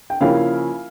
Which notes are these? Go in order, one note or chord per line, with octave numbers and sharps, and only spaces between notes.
G5
C#3 F3 A#3 C#4 E4 F5